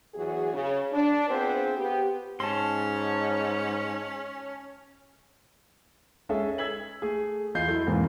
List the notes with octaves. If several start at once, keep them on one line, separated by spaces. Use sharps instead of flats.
E2 F#3 F#4 G#4
C#3
D4
B3 C4 F4 G#4 B4 C5
B3 G4
G#2 C#4 A5 C6
G#3 C#4 G#4 A4 E5
E6 G#6 B6 F#7
A3 G#4
E2 F4 D#5 G6 C7
F#3 E4 A4
E2 G#2 B2 E3 A#3 C4